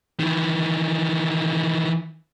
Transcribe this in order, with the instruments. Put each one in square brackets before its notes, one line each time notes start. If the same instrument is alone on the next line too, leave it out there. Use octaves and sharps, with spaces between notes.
[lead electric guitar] D#3 E3